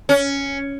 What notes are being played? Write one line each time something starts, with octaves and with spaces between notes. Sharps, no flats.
C#4